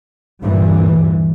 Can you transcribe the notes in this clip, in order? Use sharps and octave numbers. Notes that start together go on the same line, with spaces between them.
D2 G2 A#2 E3 G3